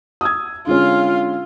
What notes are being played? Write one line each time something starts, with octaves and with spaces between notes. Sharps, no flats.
D#6 E6 G#6
D3 G#3 C#4 F4 F5